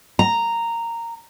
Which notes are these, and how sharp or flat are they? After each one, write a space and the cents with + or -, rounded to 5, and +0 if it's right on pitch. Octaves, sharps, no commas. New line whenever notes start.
A#5 -10